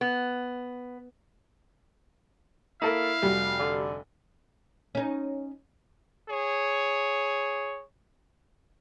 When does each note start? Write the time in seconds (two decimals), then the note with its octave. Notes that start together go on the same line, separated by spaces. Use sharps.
0.01 B3
2.82 A#3 E4 A4 A#4 F5
3.22 F1 G3 F#4
3.59 D3
4.95 C#4 D#4
6.30 G#4 C#5